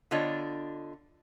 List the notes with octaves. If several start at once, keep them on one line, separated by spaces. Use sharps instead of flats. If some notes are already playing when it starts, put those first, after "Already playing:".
D3 B3 D4 F4 C#5 D#5